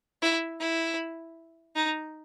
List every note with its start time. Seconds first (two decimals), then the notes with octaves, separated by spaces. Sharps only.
0.22 E4
0.60 E4
1.76 D#4